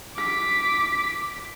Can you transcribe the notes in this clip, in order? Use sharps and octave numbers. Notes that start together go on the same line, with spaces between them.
D6 B6